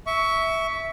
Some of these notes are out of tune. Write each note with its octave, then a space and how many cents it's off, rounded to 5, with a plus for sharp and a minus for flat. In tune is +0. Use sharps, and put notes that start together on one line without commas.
E5 -10 C#6 +20